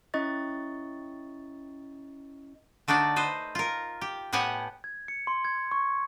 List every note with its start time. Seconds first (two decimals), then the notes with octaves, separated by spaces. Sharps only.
0.14 C#4 E4 D#5 C#6 A6
2.88 D3 A3 D4 D#4 D5
3.16 B4 C5 D#5
3.55 F4 A#4
4.01 G4
4.33 A2 B3 G4 F#5 G#5
4.84 G#6
5.08 C#7
5.27 C6
5.45 G#6
5.71 C#6